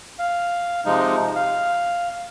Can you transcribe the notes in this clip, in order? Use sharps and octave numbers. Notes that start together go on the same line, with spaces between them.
F5
C3 F3 G#3 D#4
F5